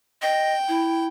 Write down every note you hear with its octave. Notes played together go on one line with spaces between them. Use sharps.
D#5 G5
E4